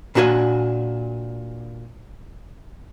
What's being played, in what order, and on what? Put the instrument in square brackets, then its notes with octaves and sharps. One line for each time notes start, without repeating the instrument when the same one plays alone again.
[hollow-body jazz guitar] A#2 D4 F#4 C#5 G#5